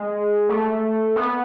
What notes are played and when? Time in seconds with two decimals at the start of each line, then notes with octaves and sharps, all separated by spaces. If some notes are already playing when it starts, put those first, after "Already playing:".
Already playing: G#3
0.49 A3
1.16 B3